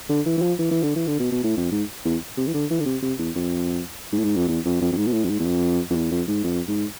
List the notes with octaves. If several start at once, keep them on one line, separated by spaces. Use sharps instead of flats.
D3
E3
E3
F3
E3
E3
D3
E3
D3
B2
B2
A2
F2
G#2
E2
C3
E3
D3
E3
D3
C3
C3
E2
F2
G#2
A2
G#2
F2
E2
F2
F2
F2
G#2
B2
A2
F2
G#2
E2
F2
F2
E2
F2
G#2
F2
G#2